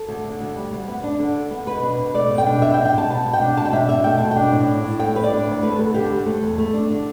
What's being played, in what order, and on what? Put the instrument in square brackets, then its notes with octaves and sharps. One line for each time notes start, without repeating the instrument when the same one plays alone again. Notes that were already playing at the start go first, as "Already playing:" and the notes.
Already playing: [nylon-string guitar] A4
D2
D3
D2
G3
D2
B3
D4
D3
D2
B3
B2 B4
D4
B2
A3 D5
B2
G5
D4
B2 E5
G5
D4
G5
B2 A5
B3 A5
B2
G5
D4
B2 A5
G5
D4 E5
B2 E5
A3 G5
B2 A5
D4 G5
A2
D4
A2
A3 G5
A2 B4
D5
D4
D2
A3 B4
D2 A4
D3 G4
D2
A3
E2
A3
D4
D3